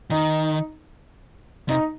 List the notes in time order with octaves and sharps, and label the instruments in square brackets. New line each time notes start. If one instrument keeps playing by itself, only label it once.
[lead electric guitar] D#3 [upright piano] D#4
[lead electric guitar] C3 [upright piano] D#4